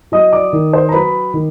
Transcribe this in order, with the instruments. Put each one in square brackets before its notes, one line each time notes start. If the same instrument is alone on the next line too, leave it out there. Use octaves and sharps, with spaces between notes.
[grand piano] F#3 D#5 D#6
D5 D6
D#3
C5 C6
A#5
F#3 B4 B5
D#3